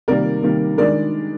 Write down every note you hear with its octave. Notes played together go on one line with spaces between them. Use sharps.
C3 D#3 G3 A#3 A#4 D5
C3 D#3 G3 A#3
D#3 G#3 D4 A#4 D5